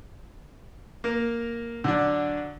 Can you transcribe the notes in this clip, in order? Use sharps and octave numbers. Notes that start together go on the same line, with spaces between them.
A#3 A#4
D3 F#3 D4